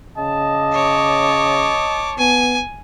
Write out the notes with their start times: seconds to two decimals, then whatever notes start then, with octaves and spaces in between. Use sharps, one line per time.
0.18 C#3 D#5 A5
0.73 C#5 D6
2.18 B3 G#5